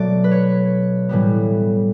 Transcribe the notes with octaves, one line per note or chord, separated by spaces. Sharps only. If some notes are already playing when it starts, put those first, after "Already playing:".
Already playing: B2 F#3 A3 D5
B4
C#5
A2 E3 G3 B3